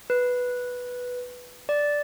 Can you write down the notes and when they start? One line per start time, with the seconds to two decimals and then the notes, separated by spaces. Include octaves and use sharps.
0.10 B4
1.69 D5